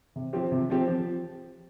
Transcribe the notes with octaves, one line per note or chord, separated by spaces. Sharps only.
C3
F3 C4 G4
C3
F3 C4 G4
F3